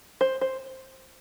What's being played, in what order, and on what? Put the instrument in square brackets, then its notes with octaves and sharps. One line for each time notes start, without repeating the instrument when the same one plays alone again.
[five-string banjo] C5
C5